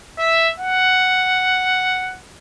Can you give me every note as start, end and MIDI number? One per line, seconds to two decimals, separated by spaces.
0.19 0.49 76
0.59 2.19 78